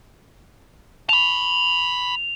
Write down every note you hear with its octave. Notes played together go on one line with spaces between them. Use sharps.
A5 B5 F7